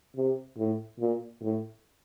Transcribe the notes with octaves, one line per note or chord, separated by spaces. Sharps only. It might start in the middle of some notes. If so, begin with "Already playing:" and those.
C3
A2
A#2
A2